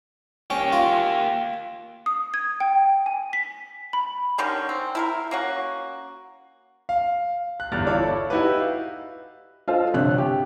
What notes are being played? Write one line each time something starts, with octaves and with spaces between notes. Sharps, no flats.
A#3 C#4 G4
F4
D#6
G#6
G5
G#5
B6
B5
D3 D#3 G3 C#4
C4
E4 A4 A#4
A#3 C#4 F#4
F5
F#6
G1 E2 G2 F6 A6
E4 F4 A4 C#5 D5
D#4 E4 F#4 G4 B4
F5
F4 A4 C5 D#5
G1 C3 C#5 F#6
G4